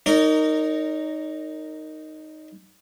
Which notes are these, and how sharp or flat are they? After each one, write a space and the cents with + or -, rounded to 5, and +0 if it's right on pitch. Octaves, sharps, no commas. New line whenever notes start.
D#4 +0 A#4 -10 C#5 +45